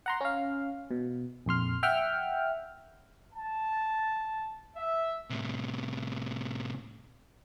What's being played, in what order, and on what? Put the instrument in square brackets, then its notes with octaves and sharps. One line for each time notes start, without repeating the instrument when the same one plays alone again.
[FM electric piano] F#5 A#5 C6
C#4 F5
B2
A#1 F2 C6 F6
E5 F#5 G5 F6
[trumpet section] A5
E5
[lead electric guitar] A2 C3